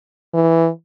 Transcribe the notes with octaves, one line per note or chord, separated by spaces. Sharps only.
E3